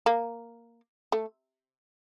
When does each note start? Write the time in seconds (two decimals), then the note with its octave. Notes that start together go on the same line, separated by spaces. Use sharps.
0.06 A#3
1.12 A3